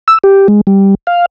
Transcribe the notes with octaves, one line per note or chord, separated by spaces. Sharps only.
E6
G4
G#3
G3
F5